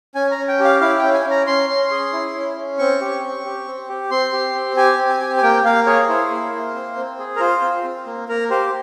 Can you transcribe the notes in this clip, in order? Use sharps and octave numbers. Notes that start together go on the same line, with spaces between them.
C#4 G#5
A#5
C#4
G5
G4
F5
E4 F5
G5
C#4
G#5
C#4
A#5
C#4 C6
C#4
G#4
E4
C#4
C#4
C4 C#6
G4
C4
G4
C4
G4
C4 C6
G4
C4
G4 G#5
C4
G#5
G4
G#5
A#3 G5
A#3 F5
G#4 C#5
E4 C5
A#3
A#3
C4
C4
G#4
A#4
F4 C5
C4
C4
A#3
A#3 A#4
G4 C5